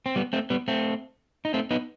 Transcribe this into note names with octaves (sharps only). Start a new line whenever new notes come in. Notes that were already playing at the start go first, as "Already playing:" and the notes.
C4
G3 B3
A3 C4
G3 B3
A3 C4
D#4
A3 C4
B3 D#4